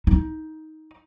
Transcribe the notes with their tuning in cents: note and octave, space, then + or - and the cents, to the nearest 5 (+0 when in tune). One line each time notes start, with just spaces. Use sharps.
D#4 +15